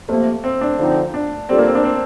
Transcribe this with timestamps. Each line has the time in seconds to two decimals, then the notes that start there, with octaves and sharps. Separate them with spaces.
0.08 C3 F3 A3 A#3
0.44 C4
0.61 D4
0.79 D3 F3 C4 D#4
1.14 D4
1.49 G3 C4 D4 F4 A4
1.58 A#3
1.67 C4
1.75 D4
1.84 C4